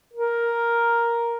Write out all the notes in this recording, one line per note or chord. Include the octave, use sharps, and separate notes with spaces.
A#4